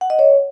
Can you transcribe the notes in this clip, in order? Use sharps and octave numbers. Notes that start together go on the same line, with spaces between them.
F#5
D#5
C#5